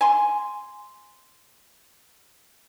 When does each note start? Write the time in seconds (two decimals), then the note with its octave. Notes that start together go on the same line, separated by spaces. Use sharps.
0.01 G#5 C6